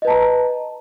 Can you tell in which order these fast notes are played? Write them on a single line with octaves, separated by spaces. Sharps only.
D#5 B4 A5 A#5